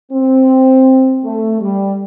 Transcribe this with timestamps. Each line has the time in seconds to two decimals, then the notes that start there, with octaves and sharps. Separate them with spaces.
0.11 C4
1.23 A3
1.60 G3